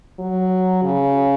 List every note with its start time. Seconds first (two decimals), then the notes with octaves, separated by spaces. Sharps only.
0.19 F#3
0.83 C#3